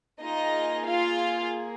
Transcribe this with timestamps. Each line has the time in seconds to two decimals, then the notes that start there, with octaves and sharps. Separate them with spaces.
0.21 A#3 D#4 F4 G#4 D#5
0.86 F4 F5